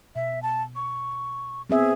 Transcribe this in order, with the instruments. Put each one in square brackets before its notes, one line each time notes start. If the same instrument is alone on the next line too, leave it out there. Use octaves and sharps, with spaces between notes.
[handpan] B2 [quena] E5
[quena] A5
C#6
[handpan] B3 C4 E5 [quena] G#4